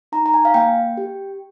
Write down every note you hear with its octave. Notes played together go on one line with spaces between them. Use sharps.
D#4 A#5
A#5
G#5
F5
A#3 G5
G4